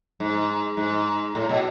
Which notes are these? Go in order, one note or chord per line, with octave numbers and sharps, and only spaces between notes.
G#2
G#2
A2
B2